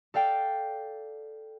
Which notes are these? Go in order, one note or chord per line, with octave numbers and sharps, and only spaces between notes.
A4 D5 F5 G5